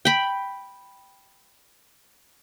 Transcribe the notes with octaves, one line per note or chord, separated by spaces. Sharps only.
G5 B5